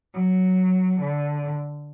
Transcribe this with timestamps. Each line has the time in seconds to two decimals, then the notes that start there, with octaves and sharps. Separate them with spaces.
0.12 F#3
0.99 D3